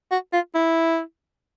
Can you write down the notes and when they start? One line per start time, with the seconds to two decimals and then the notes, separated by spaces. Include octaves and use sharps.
0.11 F#4
0.33 F4
0.55 E4